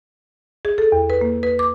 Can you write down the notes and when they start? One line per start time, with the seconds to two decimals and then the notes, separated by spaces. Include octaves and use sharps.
0.65 G#4
0.78 A4
0.92 E2
1.10 B4
1.21 A#3
1.43 B4
1.59 D6